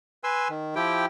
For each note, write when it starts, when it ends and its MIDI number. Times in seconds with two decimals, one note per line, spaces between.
0.24 0.48 71
0.24 0.48 80
0.24 0.48 84
0.24 0.48 88
0.49 0.75 51
0.75 1.06 53
0.75 1.06 64
0.75 1.06 67
0.75 1.06 79